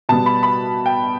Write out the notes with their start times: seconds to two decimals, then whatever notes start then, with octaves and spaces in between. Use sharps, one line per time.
0.09 B2 G3 B3 A5
0.26 B5
0.43 B5
0.86 G5